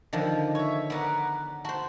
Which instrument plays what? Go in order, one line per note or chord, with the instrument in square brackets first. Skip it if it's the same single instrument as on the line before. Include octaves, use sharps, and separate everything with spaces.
[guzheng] D3 D#3 F3
[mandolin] C#5 E5
[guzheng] B3 [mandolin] A#4 D5 F#5
[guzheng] F#4 C5 [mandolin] A5